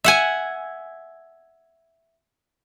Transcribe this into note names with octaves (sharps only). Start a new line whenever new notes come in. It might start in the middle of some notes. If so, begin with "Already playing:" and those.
E5 F#5 G#5